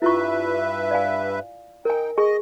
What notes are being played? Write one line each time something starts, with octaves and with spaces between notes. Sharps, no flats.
G2 E4 F4 B4 E5 C#6
D5 F5 G#5
D#4 A#4 G5 G#5
G#4 D#5 G#5 C#6